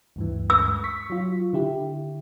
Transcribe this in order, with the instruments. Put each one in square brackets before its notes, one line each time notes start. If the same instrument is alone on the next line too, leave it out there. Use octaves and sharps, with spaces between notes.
[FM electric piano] D2 G2 E3
[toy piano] E6
[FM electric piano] C#6 B6
F#3 F4
D3 E4 G4